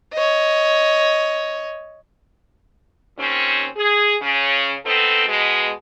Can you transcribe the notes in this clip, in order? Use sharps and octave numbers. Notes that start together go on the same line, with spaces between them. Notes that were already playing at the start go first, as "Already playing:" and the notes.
C#5 D#5
D#2 C4 C#4
G#4
C#3 C#4
B3 C4 D#4 A4
B2 G#3